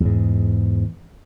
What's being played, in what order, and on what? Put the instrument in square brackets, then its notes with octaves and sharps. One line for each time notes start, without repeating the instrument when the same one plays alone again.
[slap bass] E2 G#2